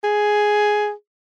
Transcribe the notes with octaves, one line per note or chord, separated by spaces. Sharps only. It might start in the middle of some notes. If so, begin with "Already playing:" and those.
G#4